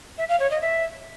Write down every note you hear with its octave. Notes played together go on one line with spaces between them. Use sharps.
E5
F5
C#5
D#5
E5